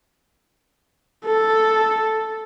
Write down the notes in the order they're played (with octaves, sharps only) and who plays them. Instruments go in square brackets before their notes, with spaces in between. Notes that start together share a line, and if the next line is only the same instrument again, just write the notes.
[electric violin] A4